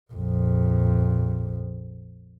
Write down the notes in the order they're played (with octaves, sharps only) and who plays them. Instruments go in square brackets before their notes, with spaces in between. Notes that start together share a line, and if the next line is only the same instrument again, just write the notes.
[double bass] A#1 F2